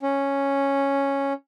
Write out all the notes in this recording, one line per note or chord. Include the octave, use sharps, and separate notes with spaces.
C#4